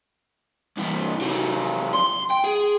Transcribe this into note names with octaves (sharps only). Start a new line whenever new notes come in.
C2 E3
C3 F#3
C6
G5
G#4